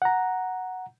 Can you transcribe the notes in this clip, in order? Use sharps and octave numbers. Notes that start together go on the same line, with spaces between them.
F#5 A#5